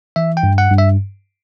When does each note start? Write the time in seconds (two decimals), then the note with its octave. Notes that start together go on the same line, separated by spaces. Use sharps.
0.16 E3 E5
0.37 G5
0.43 G2
0.58 F#5
0.71 G2
0.78 E5